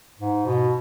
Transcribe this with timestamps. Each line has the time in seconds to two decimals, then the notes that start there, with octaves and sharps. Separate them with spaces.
0.19 G#2
0.46 B2